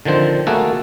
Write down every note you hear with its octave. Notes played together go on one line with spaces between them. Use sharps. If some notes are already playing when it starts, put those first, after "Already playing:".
D3 D#3 F3 C4 C5
A3 A#3 F#4 G#4 A4